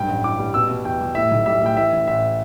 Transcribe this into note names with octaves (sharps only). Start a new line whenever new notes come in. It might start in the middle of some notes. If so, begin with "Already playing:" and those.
Already playing: B1 G2 G5
A1
E3 D6
G3
B2 E6
B2
E2 G5
G3
A2 E5
B1
G3 E5
A2 G5
E3 E5
A1
A1 E5